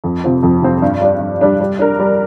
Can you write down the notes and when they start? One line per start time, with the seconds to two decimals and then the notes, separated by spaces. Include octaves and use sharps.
0.04 F2
0.24 C3 F3 C4
0.43 F2
0.62 C3 F3 C4
0.82 G2
1.01 G3 D4
1.20 G2
1.41 G3 D4
1.60 G3
1.79 D4 A#4
1.99 G3